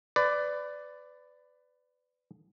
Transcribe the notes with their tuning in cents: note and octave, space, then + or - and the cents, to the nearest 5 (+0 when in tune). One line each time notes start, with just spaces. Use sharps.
B4 +25 D5 +0